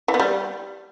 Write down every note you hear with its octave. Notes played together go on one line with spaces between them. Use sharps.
E3
B3
G3